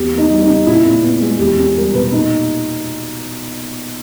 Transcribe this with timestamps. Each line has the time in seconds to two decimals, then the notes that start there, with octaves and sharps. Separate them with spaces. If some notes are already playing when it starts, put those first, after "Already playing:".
Already playing: E2 G4
0.12 A#3
0.18 D#4
0.30 G3
0.42 D#4
0.48 C#3
0.67 A#2 E4
0.85 A#2
1.03 B3
1.21 G#3
1.39 E2 G4
1.57 C#4 G4
1.76 G3 A#4
1.94 B2 B4
2.12 A#2 D#4